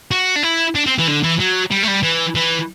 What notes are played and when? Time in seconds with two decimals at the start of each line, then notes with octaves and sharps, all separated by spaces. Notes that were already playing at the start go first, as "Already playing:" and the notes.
0.11 F#4
0.36 D4
0.43 E4
0.75 D4
0.86 C4
0.99 E3
1.07 D3
1.23 E3
1.39 F#3
1.71 G3
1.83 A3
1.88 G3
2.03 E3
2.35 E3